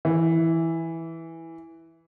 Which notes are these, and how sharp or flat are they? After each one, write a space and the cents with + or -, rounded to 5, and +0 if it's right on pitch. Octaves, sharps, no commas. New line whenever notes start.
E3 -5